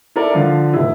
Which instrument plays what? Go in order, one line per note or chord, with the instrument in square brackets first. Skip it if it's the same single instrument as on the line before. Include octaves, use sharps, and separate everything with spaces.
[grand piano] E4 A4 A#4 D5
D3 F3 F4 F5
F1 E4